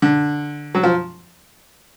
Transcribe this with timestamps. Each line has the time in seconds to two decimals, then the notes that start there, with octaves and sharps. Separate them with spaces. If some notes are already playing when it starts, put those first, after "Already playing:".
0.02 D3
0.75 F#3
0.83 F3